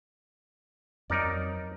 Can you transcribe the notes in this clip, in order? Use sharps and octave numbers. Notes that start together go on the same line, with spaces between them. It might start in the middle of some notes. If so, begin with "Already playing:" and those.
F2 F#3 D#4 A#4 D5